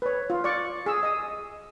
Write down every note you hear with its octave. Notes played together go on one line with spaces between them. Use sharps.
B4 C#5
F4
D5 C#6
G#4 E6
D#5 D#6